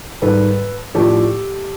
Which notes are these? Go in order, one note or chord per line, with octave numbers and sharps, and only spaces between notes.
G#2 D#3 G3 A4 B4
A2 F3 A3 D4 G4 A4